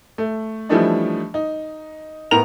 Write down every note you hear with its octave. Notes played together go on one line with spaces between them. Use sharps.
A3
E3 F3 G3 A3 D4 D#4
D#4
A2 B3 A#4 A#5 F7